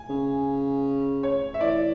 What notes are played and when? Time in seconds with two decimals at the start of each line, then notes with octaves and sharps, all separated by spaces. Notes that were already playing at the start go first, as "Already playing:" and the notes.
Already playing: G#5
0.10 C#3
1.23 C#5
1.54 E5
1.61 E3 D5